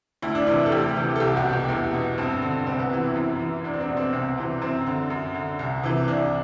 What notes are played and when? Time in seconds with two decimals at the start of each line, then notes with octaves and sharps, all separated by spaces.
0.22 D2 E4
0.35 D4
0.47 C3 E3 E4
0.66 A4
0.71 D2 G4
0.96 C3 E3
1.16 A4
1.20 C2 G4
1.37 F#4
1.45 B2
1.53 G4
1.68 E2 E4
1.93 B2
2.18 G2 C4
2.42 D3
2.67 C2 C4
2.79 B3
2.91 C3 E3 C4
3.03 E4
3.16 F#2
3.39 E3
3.64 E2 D4
3.73 C4
3.80 D4
3.89 B2
3.97 C4
4.13 C2 C4
4.38 C3 E3
4.62 F#2 C4
4.86 D3
5.10 F#2
5.34 D3
5.59 C2
5.83 C3 E3
6.08 C2 D4